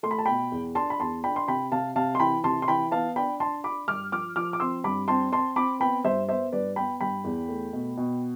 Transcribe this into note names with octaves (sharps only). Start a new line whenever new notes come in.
A3 C6
B5
A5
B2 G5 B5
E2
D4 A5 C6
B5
E2 A5 C6
D4 G5 B5
C6
C3 G5 B5
C3 F5 A5
C3 F5 A5
C6
E3 G5 B5
C3 A5 C6
C6
E3 G5 B5
B3 F5 A5
D4 G5 B5
D4 A5 C6
D4 B5 D6
G2 D6 F6
F3 D6 F6
F3 D6 F6
D6
C4 C6 E6
G2 B5 D6
C4 A5 C6
C4 A5 C6
C4 B5 D6
B3 G5 B5
G2 C5 E5
B3 C5 E5
G2 B4 D5
B3 G5 B5
G2 G5 B5
E2
A3
B2
B2